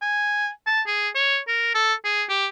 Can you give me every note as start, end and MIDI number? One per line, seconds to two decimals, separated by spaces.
0.01 0.49 80
0.66 0.81 81
0.87 1.09 68
1.15 1.38 73
1.48 1.74 70
1.74 1.94 69
2.05 2.24 68
2.29 2.47 67